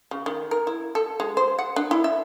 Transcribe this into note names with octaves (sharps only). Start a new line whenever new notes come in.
C#3
D#3
A#4
E4
A4
G#3
C5
F#5
D4
E4
E5